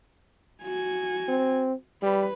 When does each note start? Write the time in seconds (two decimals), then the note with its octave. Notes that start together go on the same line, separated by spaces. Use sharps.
0.63 F#4 G#5
1.28 C4
2.02 G3 B4